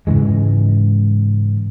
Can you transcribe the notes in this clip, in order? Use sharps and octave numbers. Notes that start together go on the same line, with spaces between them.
G#2 C#3 E3 G#3